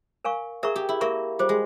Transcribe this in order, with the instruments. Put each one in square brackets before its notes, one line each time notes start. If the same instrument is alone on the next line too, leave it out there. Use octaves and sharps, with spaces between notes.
[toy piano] A#4 F5 G#5 C#6
[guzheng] G#4 [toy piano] A#4 E5 A#5 C#6
[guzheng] G4
E4
[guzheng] A#3 [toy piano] A#4 E5 A#5 C#6
[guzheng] G3 [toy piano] F4 G#4 C5
[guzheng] G#3